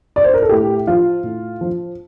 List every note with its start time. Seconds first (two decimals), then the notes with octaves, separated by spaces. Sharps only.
0.16 D5
0.24 C5
0.34 A#4
0.42 A4
0.49 A2 G4
0.87 F3 F4
1.23 A2
1.61 F3